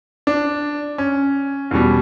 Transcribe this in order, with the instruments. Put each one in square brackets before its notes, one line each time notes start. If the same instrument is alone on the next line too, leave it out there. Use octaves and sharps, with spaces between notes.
[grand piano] D4
C#4
E2 B2 G3